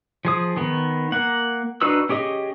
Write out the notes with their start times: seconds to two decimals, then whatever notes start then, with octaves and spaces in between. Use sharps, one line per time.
0.25 F3 G#4 D#6
0.57 D#3 B3
1.12 A#3 F#5
1.81 D4 D#4 F#4 B4 E6
2.09 C#4 G4 G#4 D#5